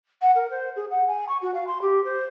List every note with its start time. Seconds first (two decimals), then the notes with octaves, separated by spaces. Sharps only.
0.21 F#5
0.35 A#4
0.50 C5
0.76 G#4
0.90 F#5
1.07 G#5
1.28 C#6
1.41 F#4
1.54 F5
1.67 C6
1.81 G4
2.04 C5